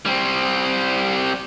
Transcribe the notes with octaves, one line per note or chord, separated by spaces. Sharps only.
G3 C4